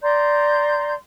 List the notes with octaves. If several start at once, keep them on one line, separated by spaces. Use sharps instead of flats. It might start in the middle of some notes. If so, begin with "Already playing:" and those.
D5 A#5 C6 G6